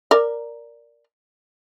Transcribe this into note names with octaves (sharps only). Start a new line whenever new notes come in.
A#4 D5